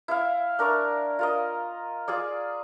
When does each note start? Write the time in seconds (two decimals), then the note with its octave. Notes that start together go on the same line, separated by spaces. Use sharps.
0.08 E4 E5 F5
0.59 D4 A#4 D5 C#6
1.19 F4 A#4 D#5
2.08 F4 G#4 D5